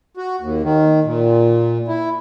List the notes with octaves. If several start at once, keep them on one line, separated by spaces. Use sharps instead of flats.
F#4
D#2
D#3
A#2
E4